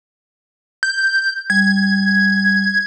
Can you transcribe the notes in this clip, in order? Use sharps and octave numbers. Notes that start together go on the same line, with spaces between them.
G6
G3 G#6